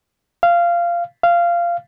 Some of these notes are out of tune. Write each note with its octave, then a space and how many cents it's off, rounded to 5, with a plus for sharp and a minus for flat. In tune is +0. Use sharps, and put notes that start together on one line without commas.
F5 -15
F5 -15